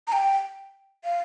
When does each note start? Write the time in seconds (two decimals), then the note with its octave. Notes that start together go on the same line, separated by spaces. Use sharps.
0.08 A#5
0.12 G5
1.04 F5